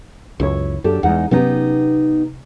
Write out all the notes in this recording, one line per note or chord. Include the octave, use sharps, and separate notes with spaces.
C#2 F#2 E4 C#5
F#2 D4 G4 A4
E2 G#3 D#4 F#5
C3 F#3 B3 C#4 D#4 G4